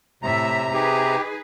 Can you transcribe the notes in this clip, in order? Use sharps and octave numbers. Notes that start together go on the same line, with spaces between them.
A2 C3 E5 A#5
D#4 G4 G#4 B4